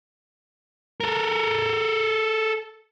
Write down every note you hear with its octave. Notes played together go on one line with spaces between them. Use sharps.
A4 A#4